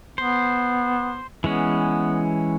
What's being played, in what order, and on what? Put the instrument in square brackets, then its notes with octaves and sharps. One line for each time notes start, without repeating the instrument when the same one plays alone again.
[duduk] B3 [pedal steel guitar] C5
[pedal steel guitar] E3 G#3 C#4 [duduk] B3